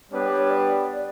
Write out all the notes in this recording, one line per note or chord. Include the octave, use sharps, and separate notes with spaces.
G3 B3 D4 G4 B4 C#5
C#5
D5